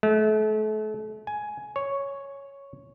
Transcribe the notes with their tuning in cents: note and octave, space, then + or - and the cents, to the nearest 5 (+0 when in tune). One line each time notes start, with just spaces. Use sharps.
A3 -35
G#5 +15
C#5 +0